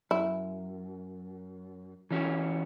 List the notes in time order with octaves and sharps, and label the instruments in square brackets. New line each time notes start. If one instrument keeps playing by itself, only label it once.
[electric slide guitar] F#2 [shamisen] E4
[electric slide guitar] E3 C#4 F#4